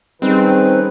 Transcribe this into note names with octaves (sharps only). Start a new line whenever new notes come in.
D#3 G3 C4 C#4 D#4 G#4 B4